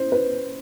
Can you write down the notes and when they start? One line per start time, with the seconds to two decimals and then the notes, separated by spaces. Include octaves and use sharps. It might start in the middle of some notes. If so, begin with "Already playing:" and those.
Already playing: C#4 E4 C5
0.12 B4